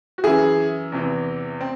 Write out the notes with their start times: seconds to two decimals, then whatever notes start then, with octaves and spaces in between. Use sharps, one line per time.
0.18 F#4
0.24 F#2 E3 E4 G#4
0.92 E2 C3 E3
1.60 C4